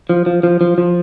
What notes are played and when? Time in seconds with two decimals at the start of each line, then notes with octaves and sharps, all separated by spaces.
0.09 F3
0.26 F3
0.43 F3
0.61 F3
0.78 F3